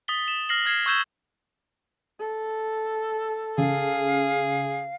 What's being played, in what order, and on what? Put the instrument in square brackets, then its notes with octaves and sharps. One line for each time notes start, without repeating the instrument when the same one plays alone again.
[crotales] D#6 A6 B6 G7
E7
F6 A#6 C7 F#7
F6 G#6 A#6 C7 E7
C#6 E6 G6 G#6 E7 G7
[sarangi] A4
[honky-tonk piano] C#3 [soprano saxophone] G#4 [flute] F5